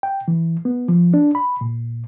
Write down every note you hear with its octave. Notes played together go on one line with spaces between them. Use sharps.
G5
E3
B3
F3
D4
B5
A#2